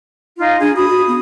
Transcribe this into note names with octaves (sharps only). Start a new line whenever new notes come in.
D#4 F4 F5
D4 G#4
F#4 B5 D#6
F#4
B3